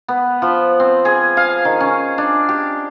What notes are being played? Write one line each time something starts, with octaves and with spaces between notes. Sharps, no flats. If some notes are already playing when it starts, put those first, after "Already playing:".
B3
F3
C4
G#4
F5
D#3
C#4
D4
G4